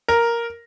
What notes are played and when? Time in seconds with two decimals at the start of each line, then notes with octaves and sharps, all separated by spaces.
0.08 A#4